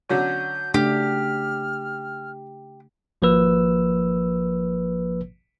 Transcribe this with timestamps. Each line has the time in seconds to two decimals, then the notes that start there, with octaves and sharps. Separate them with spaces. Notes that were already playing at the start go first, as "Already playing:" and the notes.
0.09 D3 F#3 C#4 G6
0.74 C#3 A3 D4 G4 F6
3.22 G#1 F3 A#3 B4 E6